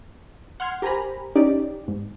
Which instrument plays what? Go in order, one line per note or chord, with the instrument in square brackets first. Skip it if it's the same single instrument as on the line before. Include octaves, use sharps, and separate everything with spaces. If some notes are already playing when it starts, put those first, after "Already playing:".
[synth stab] F#5 C6 F6 G#6
G4 A#4 C5 G#5 A#5 B5
C#4 D#4 G4 D5
G#2